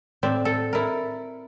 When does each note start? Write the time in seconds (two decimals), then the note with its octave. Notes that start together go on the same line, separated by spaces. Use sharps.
0.23 A2 C4 D5 E5
0.45 A4
0.73 E4 A#4